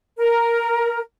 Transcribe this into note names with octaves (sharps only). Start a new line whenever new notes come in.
A#4